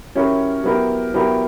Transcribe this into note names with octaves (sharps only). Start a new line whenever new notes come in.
F#3 C#4 E4 G4 A#4
F#3 B3 E4 G4 A#4
F#3 B3 E4 G4 A#4